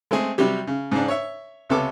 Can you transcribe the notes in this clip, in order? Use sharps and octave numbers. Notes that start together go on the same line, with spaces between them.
G#3 A3 C4 G#4
C3 F#3 G3 G4
C#3
G#2 C#3 D4
C#5 E5
C#2 C3 B3 C#4 A4 D6